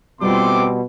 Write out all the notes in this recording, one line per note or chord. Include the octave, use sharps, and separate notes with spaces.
B2 G3 A3 C4 F4 C6 D6